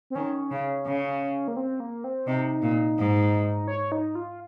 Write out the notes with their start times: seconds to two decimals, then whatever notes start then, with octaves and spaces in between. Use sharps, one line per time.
0.10 C4
0.15 D#3 C#4
0.51 C#3
0.86 C#3
1.48 A#3
1.57 C4
1.80 A#3
2.04 C4
2.27 C3 D#4
2.62 A#2
2.98 G#2
3.68 C#5
3.92 D#4
4.15 F4